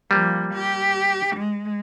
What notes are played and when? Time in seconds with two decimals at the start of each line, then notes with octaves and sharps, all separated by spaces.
0.11 F3 G3 A#3
0.54 G4
1.37 G#3